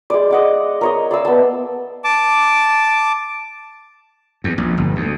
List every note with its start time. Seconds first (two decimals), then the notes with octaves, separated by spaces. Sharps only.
0.10 G#3 D5
0.31 D#5 F#5 D6
0.81 A#4 C#5 D#5
1.11 D5 F5 E6
1.25 B3 A5
2.04 A5 D6
4.44 E2
4.58 A#1
4.77 G1
4.96 D2